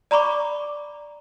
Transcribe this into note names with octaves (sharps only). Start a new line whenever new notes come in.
D5 A#5 B5 C#6 D6